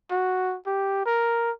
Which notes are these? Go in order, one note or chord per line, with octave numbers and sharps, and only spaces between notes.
F#4
G4
A#4